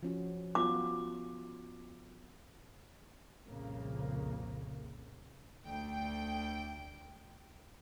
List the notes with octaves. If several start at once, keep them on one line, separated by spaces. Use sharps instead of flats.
F3 C#4 F#4
B3 F4 F#4 D6
C2 F2 A#2 C#3 A#3
D2 G5